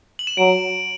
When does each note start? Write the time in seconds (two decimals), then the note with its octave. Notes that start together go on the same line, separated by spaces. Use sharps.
0.19 F#7
0.27 E7
0.37 F#3 D7